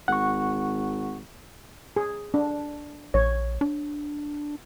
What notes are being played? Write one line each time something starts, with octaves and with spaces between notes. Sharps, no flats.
G#1 F#5 C#6
G#4
D4
A#1 C#5
D4